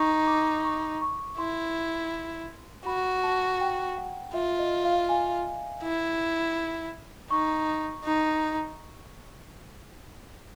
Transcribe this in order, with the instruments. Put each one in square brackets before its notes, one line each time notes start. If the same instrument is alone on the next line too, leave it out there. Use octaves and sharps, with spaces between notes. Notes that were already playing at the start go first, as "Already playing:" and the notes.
Already playing: [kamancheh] D#4 [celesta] C#6
[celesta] D6
C#6
C#6
[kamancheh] E4 [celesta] C6
[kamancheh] F#4 [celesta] B5
[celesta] A5
G5
F#5
[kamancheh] F4 [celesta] E5
[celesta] D#5
F5
G#5
[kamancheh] E4
[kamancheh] D#4 [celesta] C#6
[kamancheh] D#4